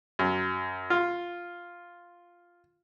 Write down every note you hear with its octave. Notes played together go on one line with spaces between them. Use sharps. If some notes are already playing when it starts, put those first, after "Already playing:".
F#2
F4